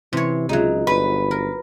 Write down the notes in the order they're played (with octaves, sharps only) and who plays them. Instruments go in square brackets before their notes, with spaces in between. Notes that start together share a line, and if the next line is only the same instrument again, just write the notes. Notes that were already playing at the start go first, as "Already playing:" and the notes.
[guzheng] C3 C#5 [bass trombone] E3
[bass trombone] C#2 [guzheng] F#3 D#4 [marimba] F4 G#4 E5
[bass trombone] G1 [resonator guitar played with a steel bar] B4
[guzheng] A#4